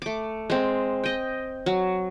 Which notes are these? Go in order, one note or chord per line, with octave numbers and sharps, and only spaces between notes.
A3 D6
G#3 C4
D#5 G5
F#3